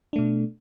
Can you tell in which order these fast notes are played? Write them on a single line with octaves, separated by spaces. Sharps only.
D4 A3 B2